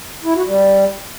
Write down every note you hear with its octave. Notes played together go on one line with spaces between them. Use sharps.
E4
F#4
G3